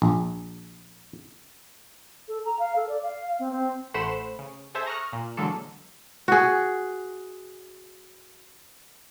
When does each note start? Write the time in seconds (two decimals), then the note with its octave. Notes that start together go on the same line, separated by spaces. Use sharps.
0.02 A#1
2.28 A4
2.45 A#5
2.59 F5
2.76 A4
2.89 D5
3.03 F5
3.39 C4
3.51 C4
3.94 A1 A3 C5 F#5 B5 E7
4.39 C#3
4.75 G#4 A4 C5 E5
4.87 A#5 C#6 D#6 F6 F#6
5.13 A#2
5.37 D3 E3 F#3 G#3 A#3 A4
6.28 F#4 G#4